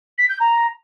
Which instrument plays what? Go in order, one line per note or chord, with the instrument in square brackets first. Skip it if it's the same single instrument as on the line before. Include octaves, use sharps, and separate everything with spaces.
[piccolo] B6
G6
A#5